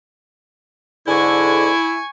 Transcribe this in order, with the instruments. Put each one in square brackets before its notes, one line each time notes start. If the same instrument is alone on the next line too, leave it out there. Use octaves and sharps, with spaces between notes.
[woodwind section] E2 G#2 D3 [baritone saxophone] E4 [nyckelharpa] G#5 C#6